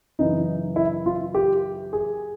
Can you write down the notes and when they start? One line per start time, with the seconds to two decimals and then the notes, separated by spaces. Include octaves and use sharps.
0.19 F#2 C#3 E3 D#4
0.76 E4
1.06 F4
1.34 G4
1.93 G#4